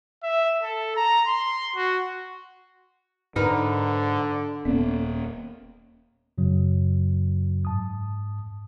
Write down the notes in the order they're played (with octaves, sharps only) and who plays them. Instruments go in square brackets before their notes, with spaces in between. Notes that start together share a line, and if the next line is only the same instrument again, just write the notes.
[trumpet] E5
A4
A#5
C6
F#4
[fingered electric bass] G#2 [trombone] D3 [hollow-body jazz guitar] D#4 A#4 B4
[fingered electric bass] D#1 A#3 [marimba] B3 C#4 A4
[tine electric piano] F#2 C#3 F#3
G#2 A5 D#6